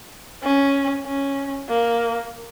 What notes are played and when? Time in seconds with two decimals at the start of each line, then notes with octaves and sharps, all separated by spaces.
0.43 C#4
1.05 C#4
1.69 A#3